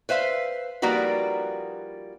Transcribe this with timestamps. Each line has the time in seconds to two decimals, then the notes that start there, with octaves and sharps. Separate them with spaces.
0.09 B4 C5 E5 F5
0.82 F3 G3 A#3 D#4 F#4 B4